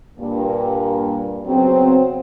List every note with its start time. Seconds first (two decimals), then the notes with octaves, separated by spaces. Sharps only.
0.19 G2 A#2 A#3
1.46 C#3 F#3 B3 C4